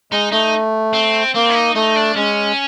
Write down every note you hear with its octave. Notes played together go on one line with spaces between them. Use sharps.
G#3 D#4
A3 D#4
C4
A#3 C4
E4
D#4
A3 D#4
D4
G#3 C#4